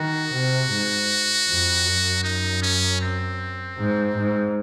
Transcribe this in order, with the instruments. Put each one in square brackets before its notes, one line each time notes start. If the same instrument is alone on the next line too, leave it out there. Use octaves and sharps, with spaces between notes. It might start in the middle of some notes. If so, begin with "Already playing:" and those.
Already playing: [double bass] D#3 [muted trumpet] F#4
[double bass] C3
G#2
F2
F#2
[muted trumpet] D#4
C#4
C4
[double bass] G#2
G#2